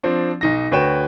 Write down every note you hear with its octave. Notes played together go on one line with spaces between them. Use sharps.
F3 C4 D4
B1 D#4 A#6
D2 F#4 B4 C#5 G5 E7